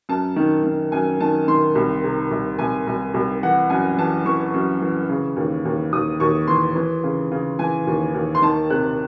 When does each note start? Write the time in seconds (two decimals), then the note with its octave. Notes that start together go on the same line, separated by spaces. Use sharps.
0.09 F#2 A5
0.36 D#3
0.64 D#3
0.92 F#2 G#5
1.20 D#3 A5
1.48 D#3 C6
1.75 C2
2.04 C3
2.31 C2
2.59 C2 G#5
2.87 C2
3.14 C2
3.43 E3 F#5
3.70 F#2 G#5
3.98 E3 A5
4.25 E3 C#6
4.54 F#2
4.82 E3
5.10 C#3
5.36 D#2
5.65 D#2
5.92 D#2 D#6
6.20 D#2 C#6
6.48 E3 C6
6.76 E3
7.04 C#3
7.32 C#3
7.59 E3 G#5
7.87 D#2
8.14 D#2
8.35 C6
8.42 D#3 A5
8.70 C3 F#6